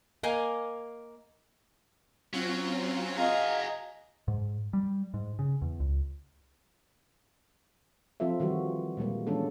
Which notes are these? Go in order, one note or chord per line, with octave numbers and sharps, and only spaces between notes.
A#3 D#5 F5 G#5
F#3 C4 C#4 F4
F#4 G#4 D#5 F5 G#5 A#5
G#2
G3
G#2
C#3
E2
C#2
F3 C4 F4 A4 E5
D#3 E3 G3 F#4
A#2 G3 G#3 A#3
E3 G#3 B3 C#4 D4 A4